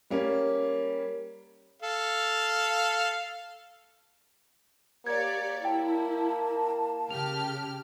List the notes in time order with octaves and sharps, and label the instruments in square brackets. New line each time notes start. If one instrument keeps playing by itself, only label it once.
[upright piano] G3 A#3 C#4
[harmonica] A4 F5
[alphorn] A#3 [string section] G4 C#5 D5 [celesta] G#6
[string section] E4 [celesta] G5 [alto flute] A5
[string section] C#3 G4 F6 [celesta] F7